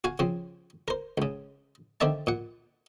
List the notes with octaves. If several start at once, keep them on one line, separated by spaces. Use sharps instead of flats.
F#4 F5 G#5
C#3 F3 C4
A#4 C5
C#2 C#3
D3 D#3 C4 D5 E5 A5
A#2 F#5